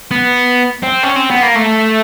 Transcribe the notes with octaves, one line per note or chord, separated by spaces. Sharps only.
B3
C4
C#4
C4
B3
A#3
A3